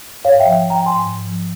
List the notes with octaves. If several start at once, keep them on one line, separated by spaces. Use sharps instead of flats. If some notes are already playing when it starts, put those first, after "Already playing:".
G#2 C#5 F5
E5 G5
F3
F3 G5 A#5
G#2 G#5 C6
G#2
F3